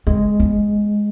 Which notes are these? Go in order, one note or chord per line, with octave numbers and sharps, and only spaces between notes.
G#3 C4
B3